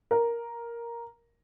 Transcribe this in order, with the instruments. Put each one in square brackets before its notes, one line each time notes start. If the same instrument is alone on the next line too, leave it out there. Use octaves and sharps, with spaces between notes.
[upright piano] A#4